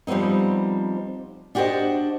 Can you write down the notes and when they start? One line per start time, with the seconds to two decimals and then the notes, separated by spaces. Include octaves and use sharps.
0.07 F3 G3 B3 C4 D#4
1.55 D4 F#4 G4 B4 C5 D#5